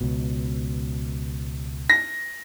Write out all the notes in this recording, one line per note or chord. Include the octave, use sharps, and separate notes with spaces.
C#2 B2
A#6